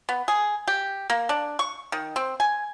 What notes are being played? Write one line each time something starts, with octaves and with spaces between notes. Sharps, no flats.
B3
G#4
G4
A#3
D4
C#6
D#3
C4
G#5